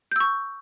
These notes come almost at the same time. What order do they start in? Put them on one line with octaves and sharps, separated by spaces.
G6 E6 C#6